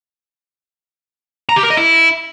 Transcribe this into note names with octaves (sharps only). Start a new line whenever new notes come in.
A#5
G4
A#4
D#5
E4